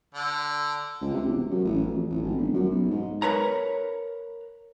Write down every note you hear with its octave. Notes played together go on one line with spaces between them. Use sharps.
D3
C#2
C3
E1
F#2
A1
F2
A1
G#1
G1
F#2
B1
G#2
A#4 B4 C#5 A#5